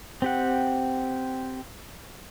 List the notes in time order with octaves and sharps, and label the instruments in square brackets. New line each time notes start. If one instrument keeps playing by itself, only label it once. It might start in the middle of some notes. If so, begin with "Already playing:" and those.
[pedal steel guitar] C4 G4 F#5